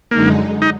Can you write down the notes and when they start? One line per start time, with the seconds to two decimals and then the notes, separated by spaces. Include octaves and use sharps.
0.10 F#2 D3 G#3 A#3 D#4
0.62 D#4